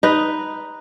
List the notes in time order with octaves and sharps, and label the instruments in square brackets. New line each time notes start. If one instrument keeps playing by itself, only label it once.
[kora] D#4 B4